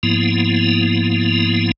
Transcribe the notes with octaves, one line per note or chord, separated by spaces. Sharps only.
G#2 F3 A#3 B3 E4